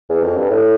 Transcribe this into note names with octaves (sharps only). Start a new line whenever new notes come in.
E2
F2
G2
A2